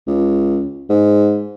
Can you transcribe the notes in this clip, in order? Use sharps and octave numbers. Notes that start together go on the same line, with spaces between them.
C#2
G#2